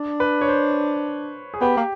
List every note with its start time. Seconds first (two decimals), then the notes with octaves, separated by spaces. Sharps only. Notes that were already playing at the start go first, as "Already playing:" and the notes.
Already playing: D4
0.20 B4
0.41 C#5
0.49 C5
1.54 G#4
1.61 B3 G4
1.77 A#3